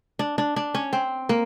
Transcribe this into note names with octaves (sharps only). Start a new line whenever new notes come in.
D4
D4
D4
C#4
C4
A#3